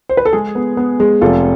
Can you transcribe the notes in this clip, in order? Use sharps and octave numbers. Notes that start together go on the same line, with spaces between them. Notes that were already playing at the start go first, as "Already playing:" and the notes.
C5
B4
A4
G#3 G#4
B3
B3
G#3
F1 F4 A4